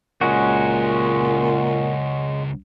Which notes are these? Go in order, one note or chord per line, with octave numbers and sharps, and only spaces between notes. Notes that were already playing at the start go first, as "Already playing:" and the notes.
C#2 A#2 G#3 C#4 F#4 A#4